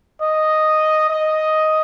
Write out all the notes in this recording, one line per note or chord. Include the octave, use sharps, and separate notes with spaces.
D#5
D#5